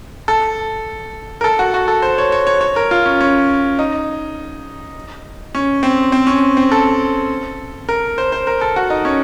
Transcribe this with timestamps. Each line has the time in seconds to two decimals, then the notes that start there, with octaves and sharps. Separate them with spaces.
0.28 A4
1.41 A#4
1.44 A4
1.59 F#4
1.74 F#4
1.88 A4
2.02 C5
2.18 C#5
2.32 C#5
2.47 C#5
2.61 C#5
2.76 A#4
2.91 F4
3.06 C#4
3.21 C#4
3.79 D#4
5.55 C#4
5.83 C4
6.12 C4
6.27 C#4
6.57 C4
6.72 A4
7.89 A#4
8.18 C5
8.32 C5
8.47 A#4
8.61 A4
8.76 F#4
8.90 D#4
9.05 C#4